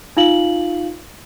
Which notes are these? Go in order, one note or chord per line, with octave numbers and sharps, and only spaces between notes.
D#4 F4 F5 F#7